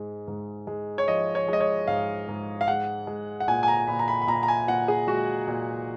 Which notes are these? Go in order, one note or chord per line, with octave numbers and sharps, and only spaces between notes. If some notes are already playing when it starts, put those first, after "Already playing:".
Already playing: G#2 G#3
G#2
G#3
C#5
F3 D#5
C#5
G#3 D#5
C#5
G#2 F5
G#2
F5
G#3 F#5
G#3
F#5
A#2 G#5
G#5
A#5
A#2 B5
A#5
B5
B5
A#2 A#5
A#5
G#5
A#2 F#5
G#4
G#3 F#4
A#2